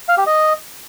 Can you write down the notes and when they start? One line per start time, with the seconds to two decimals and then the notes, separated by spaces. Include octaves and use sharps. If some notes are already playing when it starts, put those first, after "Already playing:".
0.08 F5
0.18 G4
0.27 D#5